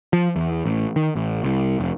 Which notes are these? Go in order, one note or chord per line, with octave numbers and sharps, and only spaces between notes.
F3
E2
A1
D#3
A1
C2
F1